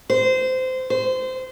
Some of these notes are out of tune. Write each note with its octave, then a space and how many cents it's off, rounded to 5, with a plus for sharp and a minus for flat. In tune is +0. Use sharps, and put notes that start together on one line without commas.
C5 -20
C5 -25